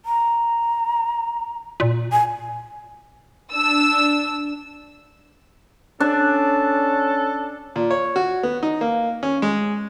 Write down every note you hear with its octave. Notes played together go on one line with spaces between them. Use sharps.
A#5
A#2
G#5
D4 E6
C#4 D4 A4
A#2
C#5
F#4
B3
D#4
A#3
C#4
G#3